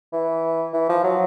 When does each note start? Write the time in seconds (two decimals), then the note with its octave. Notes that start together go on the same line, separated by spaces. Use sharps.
0.13 E3
0.73 E3
0.89 F3
1.04 F#3